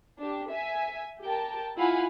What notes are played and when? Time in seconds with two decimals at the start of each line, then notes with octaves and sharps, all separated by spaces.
0.18 D4 G4
0.49 E5 G#5
1.22 G4 A#4 G5 A5
1.77 E4 F4 F5 F#5 G#5 B5